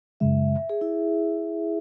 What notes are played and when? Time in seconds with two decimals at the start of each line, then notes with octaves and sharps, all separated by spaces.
0.20 F#2 C#3 G#3 E5
0.69 G#4
0.81 E4